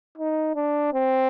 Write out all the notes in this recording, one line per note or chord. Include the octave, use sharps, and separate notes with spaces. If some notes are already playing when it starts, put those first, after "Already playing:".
D#4
D4
C4